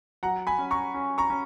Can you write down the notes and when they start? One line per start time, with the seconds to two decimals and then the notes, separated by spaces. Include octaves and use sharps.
0.23 F#3 F#5 A#5
0.47 G#5 B5
0.59 C#4
0.71 A#5 C#6
0.94 C#4
1.18 A#5 C#6
1.30 C#4